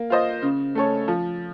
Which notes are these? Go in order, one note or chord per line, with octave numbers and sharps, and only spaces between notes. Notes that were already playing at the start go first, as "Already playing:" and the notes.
Already playing: A#3
F4 C5 D#5
C#3
A3 C#4 A4 C#5
F3